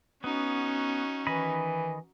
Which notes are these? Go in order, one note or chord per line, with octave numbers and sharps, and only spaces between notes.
B3 C#4 D#4 F#4
D#3 E3 D#5 B5